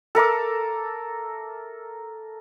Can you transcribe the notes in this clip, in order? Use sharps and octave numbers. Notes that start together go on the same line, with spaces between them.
A4 A#4 E5 D6